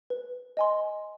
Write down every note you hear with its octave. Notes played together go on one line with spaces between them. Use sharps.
B4
D#5 G#5 C6